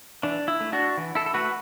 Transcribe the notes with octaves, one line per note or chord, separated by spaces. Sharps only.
E3 D4
E4
A3
D4 F#4
E3
E4 A4
A4
A3 F#4 B4